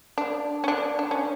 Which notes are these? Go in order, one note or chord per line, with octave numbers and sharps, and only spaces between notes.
D4
C#4
D4
D4
C#4